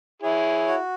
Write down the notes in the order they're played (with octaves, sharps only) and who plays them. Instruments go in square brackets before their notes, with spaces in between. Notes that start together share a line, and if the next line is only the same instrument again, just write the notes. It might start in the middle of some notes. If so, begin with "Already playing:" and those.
[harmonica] E4 G#4 [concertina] C#5
[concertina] F#4